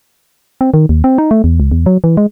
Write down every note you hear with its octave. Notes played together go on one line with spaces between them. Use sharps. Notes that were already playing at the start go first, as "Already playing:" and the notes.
C4
D#3
D#2
C4
D#4
A3
E2
C#2
E2
F#3
E3
G#3